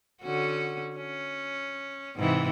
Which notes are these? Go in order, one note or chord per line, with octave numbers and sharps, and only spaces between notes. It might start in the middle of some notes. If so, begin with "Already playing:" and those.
D3 C#4 F#4
C#4
G#2 C3 E3